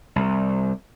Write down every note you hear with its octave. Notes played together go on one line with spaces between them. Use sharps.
C2